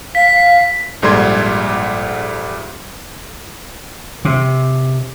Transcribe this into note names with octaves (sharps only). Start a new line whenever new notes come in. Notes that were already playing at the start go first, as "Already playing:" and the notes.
F5 B6
A#1 G#2 G3 A4 C6 G#6
C3